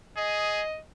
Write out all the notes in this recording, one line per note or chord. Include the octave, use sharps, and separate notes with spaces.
G#4 D#5